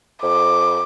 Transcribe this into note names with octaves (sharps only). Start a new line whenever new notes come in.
F2 D6